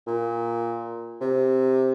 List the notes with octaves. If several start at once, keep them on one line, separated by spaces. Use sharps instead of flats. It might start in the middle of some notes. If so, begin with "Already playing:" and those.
A#2
C3